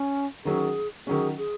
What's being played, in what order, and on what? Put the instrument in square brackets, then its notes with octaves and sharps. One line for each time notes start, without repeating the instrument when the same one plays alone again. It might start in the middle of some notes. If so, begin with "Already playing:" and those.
Already playing: [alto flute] C#4
[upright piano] D#3 F#3 C#4 [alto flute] G#4
[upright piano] D#3 F#3 C#4 [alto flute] G#4
[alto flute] G#4